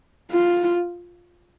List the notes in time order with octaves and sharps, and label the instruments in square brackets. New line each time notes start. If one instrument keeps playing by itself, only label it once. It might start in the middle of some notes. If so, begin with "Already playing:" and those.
[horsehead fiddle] F4